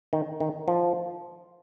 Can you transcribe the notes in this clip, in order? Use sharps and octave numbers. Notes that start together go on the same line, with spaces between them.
D#3
D#3
F3